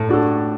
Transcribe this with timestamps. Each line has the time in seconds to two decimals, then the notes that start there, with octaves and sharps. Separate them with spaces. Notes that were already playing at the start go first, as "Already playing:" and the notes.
Already playing: A2 A3
0.09 D4 F#4 A4